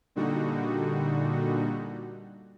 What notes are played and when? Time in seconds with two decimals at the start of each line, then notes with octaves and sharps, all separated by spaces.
0.15 A#2 D3 G3 D#4 F#4